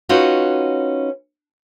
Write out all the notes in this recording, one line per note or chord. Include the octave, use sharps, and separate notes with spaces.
C#4 D#4 F4 F#4 B4